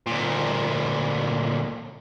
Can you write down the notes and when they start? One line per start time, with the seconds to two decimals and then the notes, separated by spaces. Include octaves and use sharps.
0.07 D2 A#2